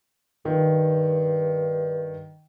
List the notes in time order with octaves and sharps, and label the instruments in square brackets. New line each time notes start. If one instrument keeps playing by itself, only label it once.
[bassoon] G2 [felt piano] D#3